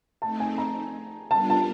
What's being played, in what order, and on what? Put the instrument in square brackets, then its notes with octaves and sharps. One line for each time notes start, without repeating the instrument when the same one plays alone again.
[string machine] A3 C4 D#4 [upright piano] A5
[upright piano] G#5
A#5
[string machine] G3 B3 D4 F4 A#4 [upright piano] A5
[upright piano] A5